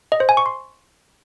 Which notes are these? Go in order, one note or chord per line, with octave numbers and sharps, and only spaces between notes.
D#5
C5
G#5
C#6
C6